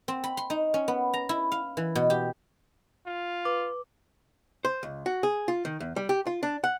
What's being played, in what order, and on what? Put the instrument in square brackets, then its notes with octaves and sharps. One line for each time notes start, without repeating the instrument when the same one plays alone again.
[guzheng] C4
B5
C6
D#4
C#4
B3
A#5
E4
F5
E3
B2
G4
[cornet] F4
[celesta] B4 [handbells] D6
[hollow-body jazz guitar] C5
C#2
F#4
G#4
F4
D#3
E2
G3
G4
F4
D4
F#5